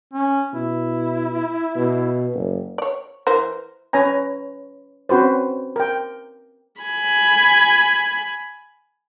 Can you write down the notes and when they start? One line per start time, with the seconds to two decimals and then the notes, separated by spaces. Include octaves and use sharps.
0.14 C#4
0.53 B2 E4
1.76 B2
2.35 F#1
2.78 C#5 D5
3.27 E3 A#4 C5
3.93 C#4 B4 C#5 G#5 A#5
5.09 C4 C#4 F#4 B4 C5
5.76 A#4 G5
6.81 G#5 B5